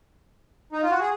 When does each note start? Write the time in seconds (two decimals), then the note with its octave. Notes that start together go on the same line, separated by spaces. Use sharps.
0.72 D#4
0.82 F4
0.91 F#4
1.00 G#4